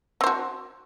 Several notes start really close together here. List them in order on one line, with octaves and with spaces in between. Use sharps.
C4 C5 F#4